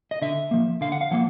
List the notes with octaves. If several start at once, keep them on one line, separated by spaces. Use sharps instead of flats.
D#5
D3 E5
F3 A#3
D3 F5
F#5
F5
F3 A#3 F#5